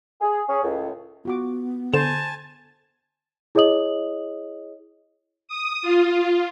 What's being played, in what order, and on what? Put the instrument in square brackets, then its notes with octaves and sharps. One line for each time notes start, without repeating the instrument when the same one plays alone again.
[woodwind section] G#4
C#4 G#4
C#2 A2
[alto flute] B3 [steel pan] F4 F#4 D6
[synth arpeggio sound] D3 E7 [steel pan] C5 [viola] G#5 A5
[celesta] E4 G#4 C#5 D#5 D#6 F#7
[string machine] D#6
F4